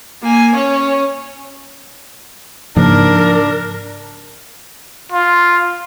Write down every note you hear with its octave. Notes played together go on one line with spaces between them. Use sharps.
A#3 G#5
C#4 C#5
G#2 C#3 F3 A#3 D4 A#4
F4